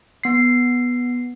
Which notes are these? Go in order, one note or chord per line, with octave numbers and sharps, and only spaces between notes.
B3 C7